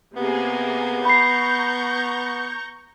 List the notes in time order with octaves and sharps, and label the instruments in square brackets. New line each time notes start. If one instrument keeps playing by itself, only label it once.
[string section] C3 A#3 G#4 [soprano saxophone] B3
[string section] A#5 C#6 G6 [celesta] B5 C7